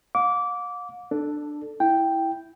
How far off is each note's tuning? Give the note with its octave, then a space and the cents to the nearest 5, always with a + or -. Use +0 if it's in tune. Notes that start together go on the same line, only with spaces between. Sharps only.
F5 +45 D6 -20
D4 +15 A4 +0
E4 +0 G5 +0